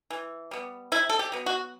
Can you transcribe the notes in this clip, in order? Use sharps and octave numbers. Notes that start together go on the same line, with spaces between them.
E3
G3 B3
C3 E4
A4
G4
F#3 B3
F#4